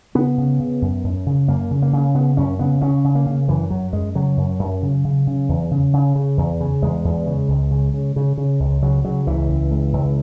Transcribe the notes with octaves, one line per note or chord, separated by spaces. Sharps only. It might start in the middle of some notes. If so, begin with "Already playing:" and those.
C#3 B3
C#3
C#3
F#2
F#2
C#3
F#2 A#3
C#3
A#3
C#3
C#3 B3
F#2 C#4
C#3 B3
C#3 C#4
C#3
A#3
C#3
F#2 E3
F#2 F#3
F#2 G#3
C#3 F#3
F#2
F#2
C#3
C#3
C#3
E2
C#3
C#3
C#3
E2
C#3
E2 G#3
E2
C#3
C#2
C#3
C#3
C#3
C#3
C#2
C#3 F#3
C#3 F#3
C#2 E3
C#2
C#2
C#2